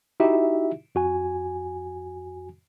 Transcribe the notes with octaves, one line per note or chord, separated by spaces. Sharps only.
D#4 E4 F#4 G4 E5
F2 F#4 G#5